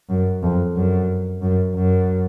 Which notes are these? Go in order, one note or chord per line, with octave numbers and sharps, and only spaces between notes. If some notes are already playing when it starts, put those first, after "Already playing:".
F#2
F2
F#2
F#2
F#2